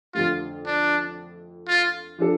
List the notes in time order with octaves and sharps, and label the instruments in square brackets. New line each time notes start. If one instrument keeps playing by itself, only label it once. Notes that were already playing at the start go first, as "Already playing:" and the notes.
[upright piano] F2 D3 A3 [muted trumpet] F4
[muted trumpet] D4
F4
[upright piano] F3 D4 A4